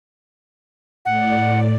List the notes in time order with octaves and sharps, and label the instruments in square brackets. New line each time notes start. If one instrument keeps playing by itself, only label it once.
[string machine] A2 D5 [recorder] F#5